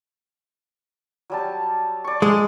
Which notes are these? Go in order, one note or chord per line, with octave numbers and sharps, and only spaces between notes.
F#3 G3 A5
D5 C#6
G#3